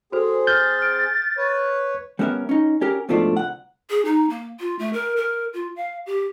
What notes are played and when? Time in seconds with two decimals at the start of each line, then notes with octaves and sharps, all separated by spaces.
0.12 C4 F#4 G#4 A4 C5
0.47 F6 G6 A6
0.79 F6 D7
1.37 B4 C#5
2.19 G3 B3 C#4 A4 A#4 E5
2.49 C#4 D#4
2.81 C#4 G4 A#4
3.09 G#2 B2 F3 A3 D4 F4
3.37 C2 F#5
3.90 G#4
4.05 D#4
4.29 A#3
4.60 F4
4.79 A3
4.93 A#4
5.16 A#4
5.53 F4
5.76 F5
6.06 G4